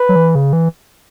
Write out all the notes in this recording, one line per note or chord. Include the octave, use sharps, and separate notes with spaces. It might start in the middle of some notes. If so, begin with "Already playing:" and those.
Already playing: B4
F#3
E3
C#3
E3